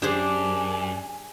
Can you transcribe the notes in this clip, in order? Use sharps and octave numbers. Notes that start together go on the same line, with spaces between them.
F#2 D4 G4 G#4 C5 G#5